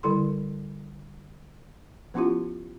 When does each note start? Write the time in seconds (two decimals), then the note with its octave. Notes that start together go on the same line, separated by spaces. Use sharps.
0.03 D3 G3 E4 A4 C6
2.14 F3 B3 C#4 E4 F4 G4